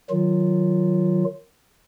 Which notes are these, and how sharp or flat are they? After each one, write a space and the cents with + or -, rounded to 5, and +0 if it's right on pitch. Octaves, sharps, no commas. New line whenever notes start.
D#3 +0 F#3 +0 F4 +0